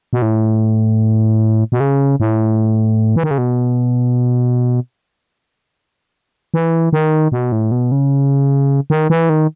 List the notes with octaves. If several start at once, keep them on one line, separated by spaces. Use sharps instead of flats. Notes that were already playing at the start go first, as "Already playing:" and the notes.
B2
A2
B2
C#3
A2
E3
D#3
C#3
B2
E3
D#3
B2
A2
B2
C#3
D#3
E3
D#3